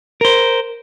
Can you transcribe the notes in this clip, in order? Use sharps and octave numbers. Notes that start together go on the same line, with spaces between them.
A#4 C5